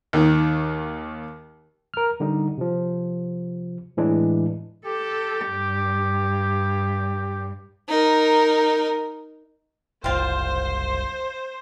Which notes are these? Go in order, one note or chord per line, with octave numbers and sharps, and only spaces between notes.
D#2 D#3
A#4 F6
D3 G3 D#4
C3 F3
A2 E3 G#3 D4
G4 A4
G2
D#4 A#4
F#1 C2 C4 F4 C5